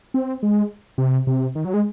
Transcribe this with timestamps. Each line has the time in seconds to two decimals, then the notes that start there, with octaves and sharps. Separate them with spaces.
0.14 C4
0.43 G#3
0.98 C3
1.27 C3
1.55 D#3
1.65 F#3
1.74 G#3